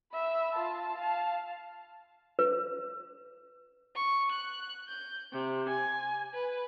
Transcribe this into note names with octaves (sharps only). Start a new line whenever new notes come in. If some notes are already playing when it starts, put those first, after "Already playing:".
E5 B5
F4 A5
F5 A5
B4
C#6
F#6
G6
C3
G#5
B4